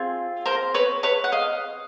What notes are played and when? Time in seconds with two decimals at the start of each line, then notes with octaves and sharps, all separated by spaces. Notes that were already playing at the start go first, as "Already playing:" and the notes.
Already playing: C4 F4 G#4
0.46 A#4 C5
0.74 B4 C#5
1.03 B4 C#5
1.24 F#5
1.32 D#5 F5